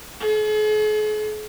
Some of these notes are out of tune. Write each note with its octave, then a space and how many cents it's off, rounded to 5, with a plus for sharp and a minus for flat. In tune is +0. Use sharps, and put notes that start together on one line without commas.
G#4 +45